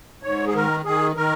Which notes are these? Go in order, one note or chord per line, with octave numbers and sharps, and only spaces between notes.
G#2 C#5
G#4
D#3 A#4
D#3 G#4
D#3 A#4